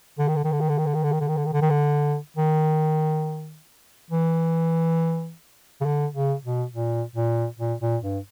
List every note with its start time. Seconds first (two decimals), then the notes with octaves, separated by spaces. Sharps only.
0.19 D3
0.28 D#3
0.36 D3
0.45 D#3
0.52 D3
0.60 D#3
0.69 D3
0.78 D#3
0.86 D3
0.94 D#3
1.03 D3
1.12 D#3
1.20 D3
1.28 D#3
1.37 D3
1.46 D#3
1.53 D3
1.61 D#3
1.70 D3
2.37 D#3
4.10 E3
5.81 C#3
5.86 D3
6.14 C#3
6.44 B2
6.72 A#2
7.16 A#2
7.59 A#2
7.81 A#2
8.03 G2